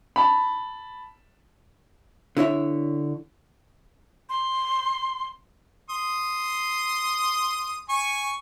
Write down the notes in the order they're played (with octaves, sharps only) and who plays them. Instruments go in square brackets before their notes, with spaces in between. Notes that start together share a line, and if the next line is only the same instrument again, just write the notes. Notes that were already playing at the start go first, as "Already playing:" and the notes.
[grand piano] A5 B5
[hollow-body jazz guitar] D3 E4 C#5 E5
[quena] C6
[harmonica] C6 D#6
G#5 C#6